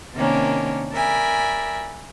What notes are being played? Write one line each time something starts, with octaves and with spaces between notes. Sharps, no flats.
C3 D#3 A#3 C#4 D4
A#4 D5 E5 G#5 B5